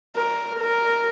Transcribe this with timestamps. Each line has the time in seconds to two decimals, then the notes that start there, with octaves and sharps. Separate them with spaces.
0.17 A#4
0.59 A#4